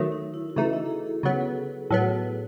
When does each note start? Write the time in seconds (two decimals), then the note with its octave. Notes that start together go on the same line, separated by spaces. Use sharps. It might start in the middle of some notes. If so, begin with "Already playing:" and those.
Already playing: D#3 F#3 A3
0.12 D#4
0.34 E4
0.50 F#4
0.56 C#3 E3 A3 D#4 E4
0.73 E4
0.86 A4
0.90 G#4
1.07 A4
1.23 C#3 F#3 B3 G#4
1.41 A4
1.58 B4
1.91 A2 F#3 B3